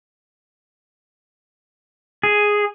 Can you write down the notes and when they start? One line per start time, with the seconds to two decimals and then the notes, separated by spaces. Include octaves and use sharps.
2.23 G#4